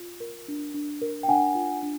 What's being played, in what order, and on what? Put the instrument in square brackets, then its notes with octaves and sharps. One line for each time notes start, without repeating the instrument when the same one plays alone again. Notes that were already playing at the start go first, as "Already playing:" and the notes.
Already playing: [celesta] F4
A#4
D4
D4
A#4
G5
D4 F#5 G#5
F4
D4